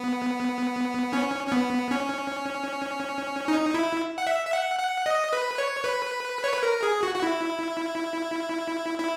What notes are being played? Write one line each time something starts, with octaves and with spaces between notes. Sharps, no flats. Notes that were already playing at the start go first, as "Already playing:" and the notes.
Already playing: B3
C#4
C#4
B3
C#4
D#4
E4
F#5
E5
E5
F#5
F#5
D#5
B4
C#5
B4
C#5
B4
A#4
G#4
F#4
F#4
E4
E4